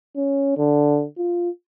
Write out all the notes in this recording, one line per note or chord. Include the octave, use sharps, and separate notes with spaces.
C#4
D3
F4